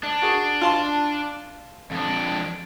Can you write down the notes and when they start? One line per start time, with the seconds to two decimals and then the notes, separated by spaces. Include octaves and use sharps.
0.04 D4
0.22 F#4 G#4
0.61 F4 A5 C6
1.92 F2 D4